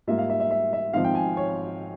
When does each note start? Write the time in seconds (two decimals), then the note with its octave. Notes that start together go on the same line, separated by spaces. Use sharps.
0.07 G#2 G3 A#3 F4 E5
0.18 F5
0.30 E5
0.40 E5
0.51 E5
0.73 E5
0.93 G#1 G#2 F3 C4 F5
1.04 G5
1.15 G#5
1.37 C#5